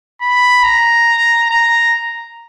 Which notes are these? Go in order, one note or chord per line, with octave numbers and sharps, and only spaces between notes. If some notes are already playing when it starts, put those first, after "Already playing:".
B5
A#5
A#5